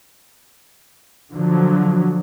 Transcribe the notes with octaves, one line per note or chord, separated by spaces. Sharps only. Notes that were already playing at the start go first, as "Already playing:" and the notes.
D3 F3 F#3